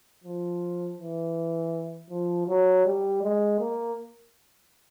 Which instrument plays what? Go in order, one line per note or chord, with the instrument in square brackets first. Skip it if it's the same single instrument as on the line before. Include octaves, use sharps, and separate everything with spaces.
[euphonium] F3
E3
F3
F#3
G3
G#3
A#3